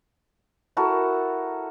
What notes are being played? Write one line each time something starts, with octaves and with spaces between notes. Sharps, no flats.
E4 F#4 A4 A#4